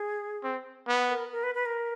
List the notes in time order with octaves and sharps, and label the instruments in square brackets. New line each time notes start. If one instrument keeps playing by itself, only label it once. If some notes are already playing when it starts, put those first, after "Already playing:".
Already playing: [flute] G#4
[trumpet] C4
B3
[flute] A#4
A#4
B4
B4
A#4